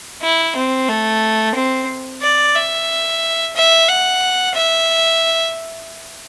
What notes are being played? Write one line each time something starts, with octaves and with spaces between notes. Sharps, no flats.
E4
C4
A3
C4
D5
E5
E5
F#5
E5